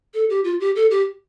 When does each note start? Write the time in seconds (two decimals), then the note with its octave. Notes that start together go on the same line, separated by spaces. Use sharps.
0.14 A4
0.30 G4
0.44 F4
0.60 G4
0.76 A4
0.91 G4